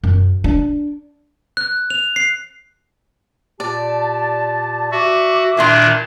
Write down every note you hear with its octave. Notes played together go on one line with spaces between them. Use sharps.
F#2
D4
F#6
F7
C7
A#2 G4 D5 A5
F#4 E5 D6
A#2 D#3 D4 E4 A#5 C6